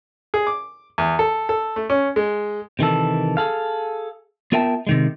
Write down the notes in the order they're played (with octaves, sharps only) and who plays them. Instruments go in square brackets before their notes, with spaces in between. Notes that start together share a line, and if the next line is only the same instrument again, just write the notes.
[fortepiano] G#4
D6
E2
A4
A4
A3
C#4
G#3
[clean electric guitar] C3 D#3 E3 A4
G#4 A4 F5
B3 F4 A#4 E5 G5 A5
C3 D#3 G#3